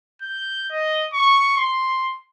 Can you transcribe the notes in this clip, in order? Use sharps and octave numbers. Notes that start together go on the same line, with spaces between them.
G6
D#5
C#6
C6